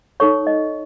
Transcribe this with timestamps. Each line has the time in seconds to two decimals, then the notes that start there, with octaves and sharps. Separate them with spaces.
0.20 D#4 A4 C#5 C#6
0.47 D#5